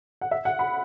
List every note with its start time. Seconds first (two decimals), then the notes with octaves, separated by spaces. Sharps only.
0.21 F#5
0.31 E5
0.45 F#5
0.59 B5